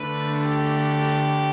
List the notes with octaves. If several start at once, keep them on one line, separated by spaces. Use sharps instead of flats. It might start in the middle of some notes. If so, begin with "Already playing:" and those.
Already playing: D3 A3 D4 B4
G4